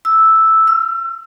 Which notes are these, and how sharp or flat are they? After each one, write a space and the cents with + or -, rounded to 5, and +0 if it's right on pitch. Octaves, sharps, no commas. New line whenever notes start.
E6 -5
E6 +40